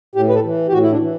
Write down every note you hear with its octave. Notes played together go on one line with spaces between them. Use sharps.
A2 G4
B4
A4
E3
G4
A2 F#4
E4
D4
E3